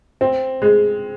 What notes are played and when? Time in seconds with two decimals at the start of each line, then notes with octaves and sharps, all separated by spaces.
0.21 C4
0.62 G#3